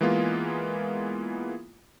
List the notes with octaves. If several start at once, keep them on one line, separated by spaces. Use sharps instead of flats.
E3 G#3 A#3 B3 F4